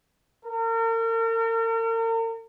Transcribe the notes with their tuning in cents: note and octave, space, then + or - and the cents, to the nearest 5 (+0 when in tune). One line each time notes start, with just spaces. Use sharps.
A#4 -40